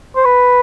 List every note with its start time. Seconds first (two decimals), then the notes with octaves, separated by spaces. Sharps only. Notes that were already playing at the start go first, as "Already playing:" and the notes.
0.16 C5
0.25 B4